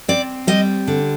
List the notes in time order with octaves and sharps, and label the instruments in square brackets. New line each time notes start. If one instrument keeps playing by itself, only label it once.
[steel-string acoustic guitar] C4 D5
G3 D#5
D3